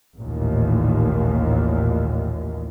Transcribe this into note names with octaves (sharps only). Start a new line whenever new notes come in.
A1 D#2 A#2